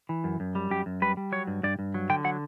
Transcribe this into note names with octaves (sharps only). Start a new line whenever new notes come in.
E3
F#2
F#2
G3
F#2 G4
F#2
G3 B4
G3
F#3 C#5
G2
G2 D5
G2
F#3
D3 G5
F#3 F#5